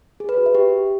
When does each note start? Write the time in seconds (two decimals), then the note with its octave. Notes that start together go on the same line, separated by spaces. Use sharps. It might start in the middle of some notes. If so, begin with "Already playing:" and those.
0.20 G#4
0.29 B4
0.37 F#4
0.46 E5
0.55 G4